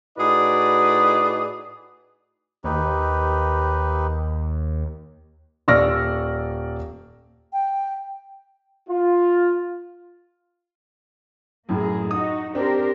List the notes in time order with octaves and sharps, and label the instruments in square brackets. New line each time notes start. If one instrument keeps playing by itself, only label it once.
[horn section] A2 D#4 F#4 G#4 B4 D5
[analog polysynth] D#2 [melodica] D#4 G4 B4
[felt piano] D#1 D5 C#6 E6 F6 A#6
[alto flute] G5
[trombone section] F4
[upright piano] F#2 A2 [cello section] A#3 G#4
[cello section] D#4 F#4 [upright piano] D#6
[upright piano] C4 D4 [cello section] G4 A#4 C5